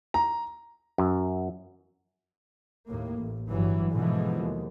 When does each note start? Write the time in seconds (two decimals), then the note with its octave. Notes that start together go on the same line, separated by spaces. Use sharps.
0.14 A#5
0.98 F#2
2.88 D#2 A2 A#3
3.19 A1
3.50 G1 G2 E3 F#3
3.92 G#2 B2 D3 E3 F3 G#3
4.39 D#2